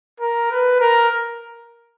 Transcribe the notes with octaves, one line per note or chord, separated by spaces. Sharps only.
A#4
B4
A#4